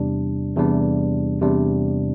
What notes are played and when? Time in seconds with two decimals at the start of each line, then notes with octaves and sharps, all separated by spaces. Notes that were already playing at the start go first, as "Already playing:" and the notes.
Already playing: E2 C3 G3 D4
0.56 E2 C3 G3 D4
1.41 E2 C3 G3 D4